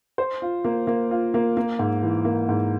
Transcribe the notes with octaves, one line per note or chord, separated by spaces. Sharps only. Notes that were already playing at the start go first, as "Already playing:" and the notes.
C5
F4
A#3
A#3
F4
A#3
A#3
G#2
E3
A#3
G#2